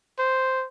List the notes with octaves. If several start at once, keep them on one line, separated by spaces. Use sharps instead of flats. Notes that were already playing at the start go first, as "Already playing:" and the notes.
C5